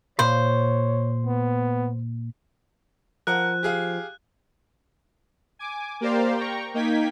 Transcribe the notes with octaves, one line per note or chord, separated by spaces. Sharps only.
A#2 C5 C#5 F5 B5
B3
F3 A#4 F#5 A5 F#6
G4 G#4 F5
G#5 D6
A#3 G4 A#4 C5 D5 F5
G5 A#5 C#6
A#3 D#4 G5 G#6 B6